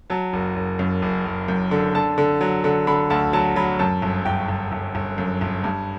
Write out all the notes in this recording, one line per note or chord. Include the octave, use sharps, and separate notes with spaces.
F#3 A5
F#1
F#1
F#2
F#1
F#1
F#2
D3
D3 A5
D3
F#3
D3
D3 B5
D2 A5
F#3 A5
F#3 B5
F#2 A5
G1
G1 G5
G1
G1
G1
F#2
G1
G2